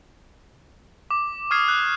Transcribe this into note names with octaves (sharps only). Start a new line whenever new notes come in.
D6
C#6 D#6 F6 G#6 C7
F#6